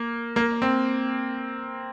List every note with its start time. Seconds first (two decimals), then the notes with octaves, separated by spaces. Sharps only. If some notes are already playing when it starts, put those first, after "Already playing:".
Already playing: A#3
0.36 A#3
0.62 C4